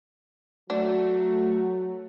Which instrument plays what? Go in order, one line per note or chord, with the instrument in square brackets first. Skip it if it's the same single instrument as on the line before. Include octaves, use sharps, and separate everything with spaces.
[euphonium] F#3 [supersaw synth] A3 [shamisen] D4 [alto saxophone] F#4